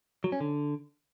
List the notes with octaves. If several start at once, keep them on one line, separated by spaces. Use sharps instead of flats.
F#3
C#4
D3